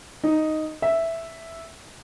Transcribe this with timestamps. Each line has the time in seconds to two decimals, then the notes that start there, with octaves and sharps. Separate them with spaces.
0.24 D#4
0.82 E5